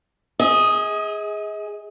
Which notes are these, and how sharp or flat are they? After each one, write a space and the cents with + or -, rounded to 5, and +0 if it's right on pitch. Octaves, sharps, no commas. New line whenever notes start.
G#4 -5 D#5 +40